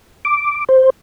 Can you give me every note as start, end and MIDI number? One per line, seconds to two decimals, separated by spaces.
0.25 0.64 86
0.69 0.90 72